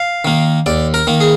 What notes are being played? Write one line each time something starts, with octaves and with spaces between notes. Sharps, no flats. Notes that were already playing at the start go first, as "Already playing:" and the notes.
Already playing: F5
D#3 A#3
D#2 D5
A#4
D#3 A#3
G#4